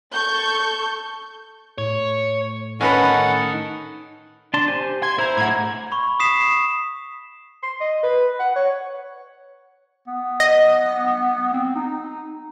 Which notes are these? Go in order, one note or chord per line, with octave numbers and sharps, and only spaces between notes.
A4 C#6 G6
A2 C#5
D#3 C#4 D#4 A4 B4 F#5 B5
D4 A5 C6
G4 C5 G#5
C6 G#6
E4 C5 A#5
A2 F#5 G#6
B5 C#6
D#6 B6 C7 E7
C6
D#5
B4
F#5
C#5
B3
D#5
C4
D#4